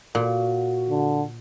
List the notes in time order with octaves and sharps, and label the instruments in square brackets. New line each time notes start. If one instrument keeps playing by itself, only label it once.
[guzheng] A#2 [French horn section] F#4
[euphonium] D3